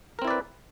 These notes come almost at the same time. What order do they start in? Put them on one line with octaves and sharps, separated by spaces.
A#4 C4 E4 D5 B4